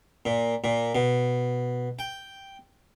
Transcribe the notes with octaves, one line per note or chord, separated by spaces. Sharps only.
A#2
A#2
B2
G5